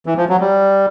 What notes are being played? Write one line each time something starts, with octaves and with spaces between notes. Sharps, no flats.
E3
F3
F#3
G3